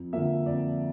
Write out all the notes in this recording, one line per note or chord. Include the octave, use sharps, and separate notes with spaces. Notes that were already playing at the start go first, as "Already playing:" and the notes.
Already playing: F2
D3 F3 A#3 E5
F2 D5